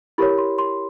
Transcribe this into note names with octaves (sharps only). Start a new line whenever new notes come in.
E4 G4 A#4 C#5 B5
C6
C6